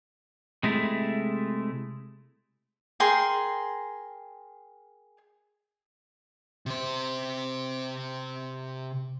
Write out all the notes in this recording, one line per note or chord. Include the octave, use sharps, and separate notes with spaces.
C3 G#3 A3 E4
G#4 A#4 G5 C6
C3 C5